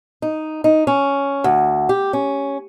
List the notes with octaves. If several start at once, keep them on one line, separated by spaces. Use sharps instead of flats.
D#4
D#4
C#4
D2
G4
C#4